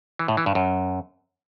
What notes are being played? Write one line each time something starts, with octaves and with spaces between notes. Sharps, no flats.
E3
A2
E3
G2
F#2